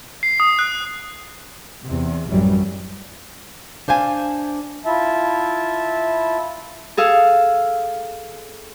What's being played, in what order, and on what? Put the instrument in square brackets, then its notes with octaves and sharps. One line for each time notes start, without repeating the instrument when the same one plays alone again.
[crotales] C7
D#6
F#6
[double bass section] E2 C3
A1 F#2 E3 F#3 G3
[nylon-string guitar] D4 C5 F5 G#5
[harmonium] E4 F4 E5 A5
[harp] G#4 A4 F5